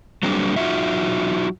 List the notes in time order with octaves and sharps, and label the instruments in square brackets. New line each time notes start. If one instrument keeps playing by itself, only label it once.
[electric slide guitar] F#3 G3 A#3 C4 D4 G#4
F#3 D#4 F4 F#4 E5